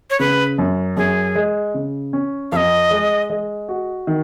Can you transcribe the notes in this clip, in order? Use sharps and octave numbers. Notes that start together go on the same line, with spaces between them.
C#5
C#3 B4
F#2
F#2 G#4
G#3
C#3
C#4
F2 D#5 F5
G#3
G#3
F#4
D#3